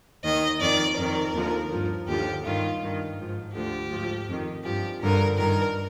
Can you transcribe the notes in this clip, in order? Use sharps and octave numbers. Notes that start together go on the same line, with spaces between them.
D#2 D#3 D#5
F2 D#3 D5
F2 D#3 A#4
D#2 D3 F3
G2 F3
D#2 D3 F3 G4
G2 D#3 F4
G2 D#3
G#2 F3
D2 D3 F3 G4
G#2 F3
F2 D#3
G2 F3 G4
G2 D3 F3 A#4
G2 D#3 A#4